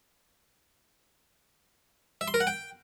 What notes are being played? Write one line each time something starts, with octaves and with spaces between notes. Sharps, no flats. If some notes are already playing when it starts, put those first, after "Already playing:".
E5
C6
A#4
F#5
G5